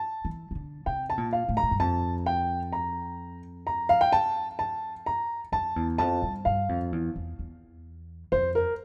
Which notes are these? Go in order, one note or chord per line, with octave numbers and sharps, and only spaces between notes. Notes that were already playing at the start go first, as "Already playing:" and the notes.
Already playing: A5
E3
E3
D3
C3 G5
A5
A#2
F5
A2
A#5
A2
G2
F2 A5
G5
A#5
A#5
F5
G5
A5
A5
A#5
F2 A5
E2
F2 A5
G2
G2 F5
F2
E2
E2
E2
F2 C5
A#4